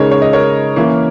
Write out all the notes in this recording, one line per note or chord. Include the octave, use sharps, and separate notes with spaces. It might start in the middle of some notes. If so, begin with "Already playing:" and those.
Already playing: C#3 G#3 D#4 A#4 C#5
C#5
D#5
A#4 C#5
E3 A#3 C#4 E4